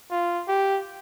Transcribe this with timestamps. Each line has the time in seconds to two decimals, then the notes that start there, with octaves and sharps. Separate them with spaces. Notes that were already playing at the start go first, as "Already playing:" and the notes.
0.11 F4
0.48 G4